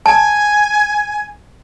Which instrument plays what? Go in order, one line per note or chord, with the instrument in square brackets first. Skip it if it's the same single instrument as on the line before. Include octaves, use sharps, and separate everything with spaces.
[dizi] G#5 [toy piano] A5